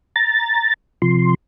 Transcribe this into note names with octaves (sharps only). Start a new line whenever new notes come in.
A#5 A6
C3 F3 C6